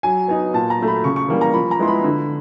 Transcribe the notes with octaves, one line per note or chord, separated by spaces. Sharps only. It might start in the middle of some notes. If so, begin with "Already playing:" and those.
F#3 G#5
B3 D#4 G#5
A#2 A5
A#5
F#3 A3
B5
C#3 C#6
C#6
E3 G3 A#3
A#5
F3 B5
A#5
G#3 B3 E4 C6
B5
D3